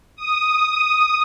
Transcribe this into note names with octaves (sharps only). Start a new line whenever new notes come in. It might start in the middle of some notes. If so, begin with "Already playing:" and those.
D#6